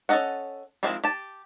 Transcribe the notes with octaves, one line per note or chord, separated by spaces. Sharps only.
C#4 D#4 A4 D#5 F#5
D#3 F3 G#3 C4 E4
G4 A5